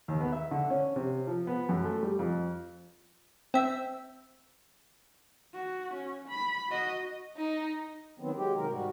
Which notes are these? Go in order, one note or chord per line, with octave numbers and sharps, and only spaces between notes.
D#2
B3
E5
D3
C#4
C3
F3
B3
F#2
A3
G3
F2
C4 E5
F#4
C#4
B5
F#4 D#5
D#4
D#3 F#3 B3 C4
F#3 G#3 G4
C3 D#3 F#3 G#3 A#3 A#4
G#2 G3 F#4